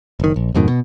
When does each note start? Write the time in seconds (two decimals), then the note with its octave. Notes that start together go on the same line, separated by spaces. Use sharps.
0.20 F#1 D#3
0.36 A#1
0.55 F2 G#2 B2 D#3
0.68 B2